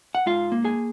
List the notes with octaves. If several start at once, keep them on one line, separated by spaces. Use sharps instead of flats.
F#5
G#2 F4 F5
A#3
G#4 G#5